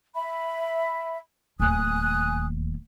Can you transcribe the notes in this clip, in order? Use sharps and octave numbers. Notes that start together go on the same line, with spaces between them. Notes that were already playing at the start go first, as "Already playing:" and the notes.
E5 B5
D1 D#2 G#5 D#6 F#6